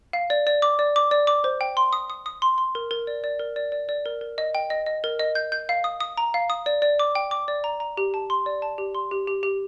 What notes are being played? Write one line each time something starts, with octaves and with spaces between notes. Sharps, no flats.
F5
D5
D5
D6
D5
D6
D5
D6
C5
G5
C6
D#6
D#6
D#6
C6
C6
A#4
A#4
D5
D5
A#4
D5
D5
D5
A#4
A#4
D#5
G5
D#5
D#5
A#4
D#5
G6
G6
F5
D#6
D#6
A#5
F5
D#6
D5
D5
D6
G5
D6
D5
A#5
A#5
G4
A5
C6
D5
A5
G4
C6
G4
G4
G4